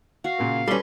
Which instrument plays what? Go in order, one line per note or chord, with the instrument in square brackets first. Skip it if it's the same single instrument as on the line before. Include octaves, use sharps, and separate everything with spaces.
[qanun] F#4 [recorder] F5
[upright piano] A#2 C#3 A#3
[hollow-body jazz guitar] G3 C#4 [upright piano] A4 [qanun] B4 C6